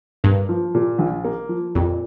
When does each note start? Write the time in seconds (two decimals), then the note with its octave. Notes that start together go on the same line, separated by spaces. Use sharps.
0.24 G2 A#3
0.49 F3
0.75 A#2
0.99 A#1
1.25 A#3
1.49 F3
1.75 F2 A#2